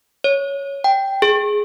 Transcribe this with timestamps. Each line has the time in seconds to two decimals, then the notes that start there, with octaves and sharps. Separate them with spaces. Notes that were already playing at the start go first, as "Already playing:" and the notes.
0.24 C#5
0.84 G5
1.22 G#4